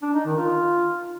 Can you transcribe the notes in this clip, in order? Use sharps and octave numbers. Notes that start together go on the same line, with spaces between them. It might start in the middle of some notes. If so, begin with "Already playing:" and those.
D4
D#4
D#3
F4